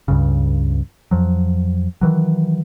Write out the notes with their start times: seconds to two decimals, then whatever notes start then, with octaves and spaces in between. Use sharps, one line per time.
0.08 C#2 G2 C#3
1.11 F2 F3 F#3
2.01 D#3 E3 F#3